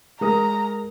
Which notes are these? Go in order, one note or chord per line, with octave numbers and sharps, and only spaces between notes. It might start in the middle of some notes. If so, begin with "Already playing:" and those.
G#3 A#4 A#5 D#6